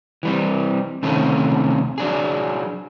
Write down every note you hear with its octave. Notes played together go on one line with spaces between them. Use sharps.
E3 G3 C4
C3 D#3 A3 C4 C#4
F#3 D4 G#4